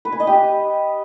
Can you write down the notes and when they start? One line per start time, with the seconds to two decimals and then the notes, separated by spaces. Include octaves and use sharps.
0.05 B4
0.12 G#5
0.20 D#5
0.27 G4